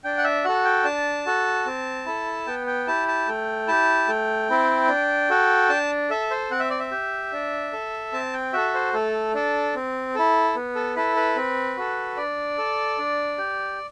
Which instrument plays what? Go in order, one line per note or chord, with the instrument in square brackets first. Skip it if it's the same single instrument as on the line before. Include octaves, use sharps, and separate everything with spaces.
[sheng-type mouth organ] D4 G5
F#5
E5
F#4 A4 F#5
G5
D4 A5
F#4 A4
C4
E4 A4
B3 G5
G5
E4 G4 A5
A5
A3 G5
E4 G4 A5
A3 G5
C4 E4
D4
F#4 A4
D4 A5
A4 E5
C5
C4 F#5
E5
D5
E5
G4
D4
A4
C4 A5
G5
F#4 A4 E5
C5
A3 A4
D4 A4
C4
E4 A4
B3
A4
E4 A4 B4
B4
C4
F#4 A4
D4 D5
A4
D4
G4